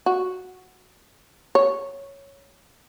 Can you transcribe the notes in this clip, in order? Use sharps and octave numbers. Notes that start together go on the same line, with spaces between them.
F#4
C#5